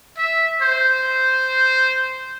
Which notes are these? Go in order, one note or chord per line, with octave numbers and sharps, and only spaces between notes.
E5
C5